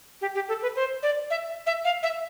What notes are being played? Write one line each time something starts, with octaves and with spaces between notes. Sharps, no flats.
G4
G4
A4
B4
C5
D5
E5
E5
F5
E5